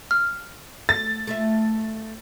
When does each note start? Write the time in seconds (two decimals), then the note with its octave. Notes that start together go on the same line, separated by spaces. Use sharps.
0.11 F6
0.89 A3 A6
1.27 A3 F4 E5